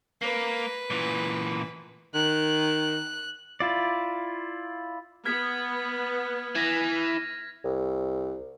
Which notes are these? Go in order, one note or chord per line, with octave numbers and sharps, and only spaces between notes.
A#3 B4
A#2 E3
D#3 F#6
E4 F4 D5
B3 F6 G#6 B6
E3 G#6 A#6
C2